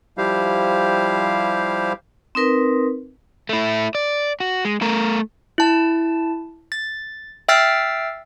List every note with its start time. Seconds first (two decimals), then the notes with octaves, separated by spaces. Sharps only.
0.18 F3 G3 E4 G4 C5 F5
2.35 C4 D#4 A#4 B4
3.49 A3 E4
3.95 D5
4.40 F#4
4.65 G#3
4.82 A3 A#4
5.58 E4 A5
6.72 A6
7.49 E5 G5 E6 F6 A6 C7